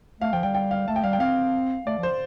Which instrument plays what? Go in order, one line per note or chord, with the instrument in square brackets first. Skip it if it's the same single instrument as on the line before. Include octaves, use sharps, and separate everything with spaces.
[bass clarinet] A3 [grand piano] F5
[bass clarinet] F3 [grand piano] G5
[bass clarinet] G3 [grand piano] G5
[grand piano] G5
F5
[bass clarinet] A3 [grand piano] A5
[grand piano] G5
[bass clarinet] G3 [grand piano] F5
[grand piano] G5
[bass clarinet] C4 [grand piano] F5
[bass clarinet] A3 [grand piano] D5
[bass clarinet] F3
[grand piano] C5